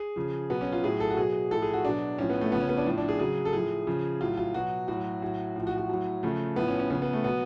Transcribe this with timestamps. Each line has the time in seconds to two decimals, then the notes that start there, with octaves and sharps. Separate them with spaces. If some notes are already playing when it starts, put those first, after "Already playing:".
Already playing: G#4
0.16 C#3 F3
0.50 B2 F#3 B3
0.61 C#4
0.72 F4
0.84 A2 F#3 G#4
1.00 A4
1.10 F#4
1.17 B2 F#3 G#4
1.51 A2 F3 A4
1.62 G#4
1.73 F#4
1.84 B2 F#3 D4
2.18 A2 F3 C#4
2.30 B3
2.41 A3
2.52 C#3 F3 B3
2.61 C#4
2.69 B3
2.77 D4
2.86 A2 F3
2.97 D4
3.08 G#4
3.19 C#3 F#3 G#4
3.45 A4
3.53 A2 F3 G#4
3.87 C#3 F3
4.20 A2 F#3 F4
4.38 F4
4.54 B2 F#3 F#4
4.88 A2 F#3 F#4
5.22 A2 F#3
5.56 A2 F3
5.67 F#4
5.78 F#4
5.89 A2 F#3
6.23 C#3 F3 A3
6.56 A2 F3 B3
6.68 C#4
6.79 C#4
6.90 C#3 F3 B3
7.02 B3
7.13 A3
7.24 B2 F#3 B3